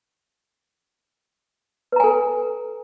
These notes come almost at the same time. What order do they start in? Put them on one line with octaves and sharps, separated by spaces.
B4 A#5 G#5 A4